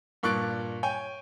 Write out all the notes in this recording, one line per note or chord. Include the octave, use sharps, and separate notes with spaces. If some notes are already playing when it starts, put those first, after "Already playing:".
G2 A#2 C#6 F#6 A6 D7
C#5 G5 G#5